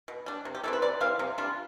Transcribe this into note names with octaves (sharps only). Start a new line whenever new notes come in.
B2
G3 D4
C3
G4
E3 G3 C4 A4
B4
C3 D5
E3 G3 C4 F5
C3
G3 D4 F4